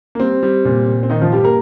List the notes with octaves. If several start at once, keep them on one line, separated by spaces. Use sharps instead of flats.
A#3
G3 C4
G3
A#2
A#2
C4
D#3 D#4
F3 F4
G2 G3 G4
A#3 A#4